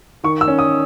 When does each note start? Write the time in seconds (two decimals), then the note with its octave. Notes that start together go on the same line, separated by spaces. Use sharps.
0.24 D#3 C#6
0.41 E6
0.48 C#4
0.59 D#6